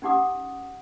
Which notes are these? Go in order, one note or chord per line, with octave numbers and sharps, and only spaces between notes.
C#4 D#4 G4 F#5 D6 D#6